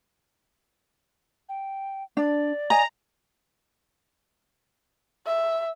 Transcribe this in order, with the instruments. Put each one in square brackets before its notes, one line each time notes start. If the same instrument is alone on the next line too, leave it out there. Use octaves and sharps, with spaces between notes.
[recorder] G5
[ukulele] D4 [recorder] D5
[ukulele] D#5 G#5 [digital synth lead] A#5
[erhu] E5